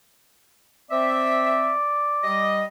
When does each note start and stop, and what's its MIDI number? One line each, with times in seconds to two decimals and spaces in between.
0.91 1.73 60
0.91 2.59 74
0.91 1.73 76
2.24 2.65 55
2.24 2.65 75